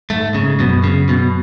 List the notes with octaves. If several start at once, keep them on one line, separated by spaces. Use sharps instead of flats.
G#2 A3
G#2 C#3
F#2 B2
C#3
B2